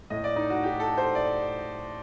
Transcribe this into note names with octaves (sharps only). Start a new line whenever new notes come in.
A2 D#5
D5
D#4
F#4
G4
A4
C5
D5